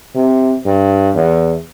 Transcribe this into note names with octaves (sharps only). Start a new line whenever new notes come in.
C3
G2
E2